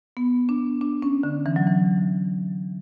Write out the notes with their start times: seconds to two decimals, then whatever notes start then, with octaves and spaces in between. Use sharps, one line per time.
0.17 B3
0.49 D4
0.81 D4
1.02 C#4
1.23 D3
1.46 E3
1.56 F#3
1.67 E3